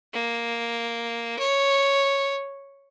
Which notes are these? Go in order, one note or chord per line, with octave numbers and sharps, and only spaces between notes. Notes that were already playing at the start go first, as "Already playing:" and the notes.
A#3
C#5